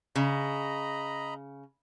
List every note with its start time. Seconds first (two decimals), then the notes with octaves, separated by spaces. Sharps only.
0.16 C#3 D#5 A#5 B5